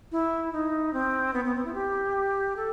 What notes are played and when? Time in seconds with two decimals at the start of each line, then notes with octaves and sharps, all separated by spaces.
0.12 E4
0.53 D#4
0.93 C4
1.34 B3
1.45 B3
1.55 C4
1.65 E4
1.74 G4
2.56 A4